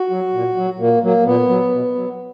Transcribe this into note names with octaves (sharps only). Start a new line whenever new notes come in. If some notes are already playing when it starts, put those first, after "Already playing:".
Already playing: F#4
F#3
A#2
F#3
A#2 A#3
F#3 A#3
A#2 B3
F#3
B2
F#3